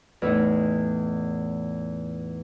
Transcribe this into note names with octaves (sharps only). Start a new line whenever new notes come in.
E2 A2 D#4